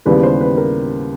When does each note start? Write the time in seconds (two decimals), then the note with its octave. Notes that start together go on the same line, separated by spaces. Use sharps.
0.06 D#2 C#3 E3 G3 B3 B4
0.23 C5
0.41 B4
0.57 A#4